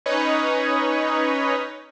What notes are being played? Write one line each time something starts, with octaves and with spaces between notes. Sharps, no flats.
C#4 D#4 B4 C#5 D#5